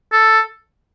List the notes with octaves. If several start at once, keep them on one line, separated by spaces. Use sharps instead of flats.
A4